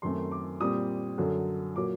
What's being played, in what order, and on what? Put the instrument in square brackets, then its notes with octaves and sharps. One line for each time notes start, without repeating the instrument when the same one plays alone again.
[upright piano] F#2 D#3 A3 C4 C6
D6
A#2 G3 C4 D#6
F#2 D3 F#3
A#2 F#3 A#3 D6